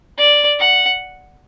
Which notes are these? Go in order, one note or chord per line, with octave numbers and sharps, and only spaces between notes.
D5
F#5